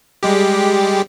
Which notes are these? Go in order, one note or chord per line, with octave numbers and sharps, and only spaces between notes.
G3 G#3 G4